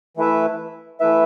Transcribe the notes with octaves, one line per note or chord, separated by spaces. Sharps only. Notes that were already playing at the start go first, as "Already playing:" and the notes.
E3 A3 E4 B4 E5
E3 A3 E4 B4 E5